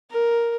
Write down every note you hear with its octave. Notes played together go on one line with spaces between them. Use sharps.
A#4